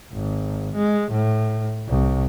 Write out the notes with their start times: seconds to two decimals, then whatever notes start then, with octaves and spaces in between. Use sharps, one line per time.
0.13 G#1
0.75 G#3
1.12 A2
1.89 C2